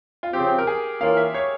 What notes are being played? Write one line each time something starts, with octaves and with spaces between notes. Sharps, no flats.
F4
C#3 F3 C4 G4
A#4
G#4
E3 A#3 C#4 F4 F5
E5
C#5